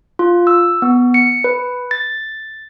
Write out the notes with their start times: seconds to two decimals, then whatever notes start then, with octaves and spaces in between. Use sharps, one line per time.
0.19 F4
0.47 E6
0.82 B3
1.14 C#7
1.44 B4
1.91 A6